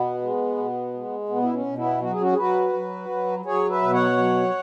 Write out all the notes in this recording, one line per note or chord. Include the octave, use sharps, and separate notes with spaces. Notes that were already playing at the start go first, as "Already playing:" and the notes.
Already playing: B2 B3
G#3
B2
G#3
B2 B3
E4
C#4
B2
B3 E4
F#3 F#4
G#4
C#4 F#4
G#4
F#3 F#4 B4
F#3
F#3
F#3 G#4 C#5
B4 E5
B2
C#5 F#5
F#3